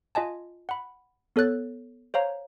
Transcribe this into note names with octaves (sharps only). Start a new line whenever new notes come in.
F4 D#5 G#5 A5
F#5 B5
B3 A4 C#5 F#6 A6
C5 C#5 F5 A#5